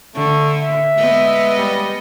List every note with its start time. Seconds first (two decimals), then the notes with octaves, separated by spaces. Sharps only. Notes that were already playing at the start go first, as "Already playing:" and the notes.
0.15 D3 A3
0.62 E5
0.96 G#3 B3 D#5
1.57 G3